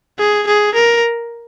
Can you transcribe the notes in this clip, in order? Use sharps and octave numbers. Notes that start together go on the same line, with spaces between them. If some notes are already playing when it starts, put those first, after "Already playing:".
G#4
G#4
A#4